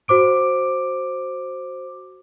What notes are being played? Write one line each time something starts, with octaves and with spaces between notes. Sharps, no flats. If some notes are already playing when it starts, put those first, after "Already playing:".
F#4 C5 D6 D7